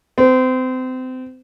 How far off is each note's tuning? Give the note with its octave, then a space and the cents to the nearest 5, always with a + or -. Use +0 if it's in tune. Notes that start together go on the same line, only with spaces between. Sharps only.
C4 -30